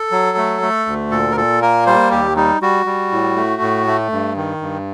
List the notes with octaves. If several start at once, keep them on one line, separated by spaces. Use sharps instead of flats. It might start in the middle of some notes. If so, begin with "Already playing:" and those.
Already playing: A4
F#3
A3
A3
D2
A#2 A4
A#4
A#2 A4
A#3 A#4
G3 C5
D#2 G4
G3 D#4
G3 F#4
G3
A2
A3
A2
A3
G2
D#3
G2